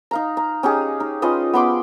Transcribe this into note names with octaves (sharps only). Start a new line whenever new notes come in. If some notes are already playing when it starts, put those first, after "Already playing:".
D#4 F5 A#5
A#5
C#4 D#4 G4 G#4
D#4
C#4 F4 B4 D#5
B3 B5 C6 D6